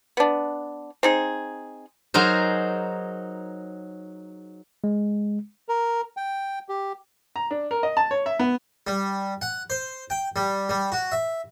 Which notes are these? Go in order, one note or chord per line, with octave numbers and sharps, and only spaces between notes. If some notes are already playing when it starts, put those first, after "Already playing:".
B3 D4
C4 D#4 G#4
F#3 D#4 G#4 A#4 C5
G#3
A#4
G5
G4
A#5
D4
A#4
D#5
A5
C#5
E5
B3
G3
F#5
C5
G5
G3
G3
F#4
E5